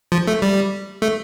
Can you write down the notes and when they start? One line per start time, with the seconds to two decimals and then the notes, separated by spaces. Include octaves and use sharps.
0.12 F3
0.27 A3
0.42 G3
1.02 A3